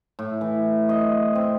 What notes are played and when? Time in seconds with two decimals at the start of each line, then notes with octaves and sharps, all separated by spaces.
0.19 A2
0.41 E3
0.89 D#5
1.35 C4